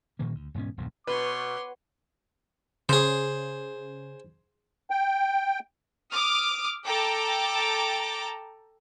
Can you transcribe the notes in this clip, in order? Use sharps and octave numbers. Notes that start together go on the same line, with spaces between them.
A#2 D#3 F3 A#3
D2
E1 G#2 B3 C#4
D#1 B1 E2 G2
B2 B4 C#5 C6 D6
C#3 G#4 C5
G5
D6 D#6 F6
A4 G5 A5 A#5 D6